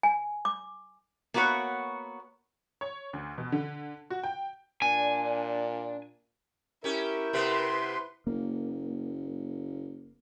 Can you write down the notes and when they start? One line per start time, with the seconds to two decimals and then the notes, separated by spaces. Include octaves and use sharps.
0.03 G#5
0.45 D6
1.34 A#3 B3 F#4 B4 C#5
2.81 C#5
3.13 D2
3.38 B2
3.52 D3
4.10 F#4
4.23 G5
4.82 A#2 D4 G#5
6.84 C#4 E4 G4 A#4
7.33 C3 B3 G4 B4 C6
8.27 F#1 A#3